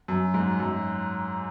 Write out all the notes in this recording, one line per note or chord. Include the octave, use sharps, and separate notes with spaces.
F#2
G#2
F#2